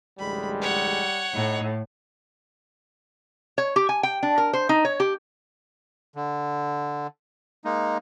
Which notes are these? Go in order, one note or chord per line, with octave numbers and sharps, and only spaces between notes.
A1 D2 G3 G#3 B5
C#5 F#5
A2 D#4
C#5
G4
G#5
G5
D4
A#4
C5
D#4
C#5
G4
D3
G#3 A#3 D#4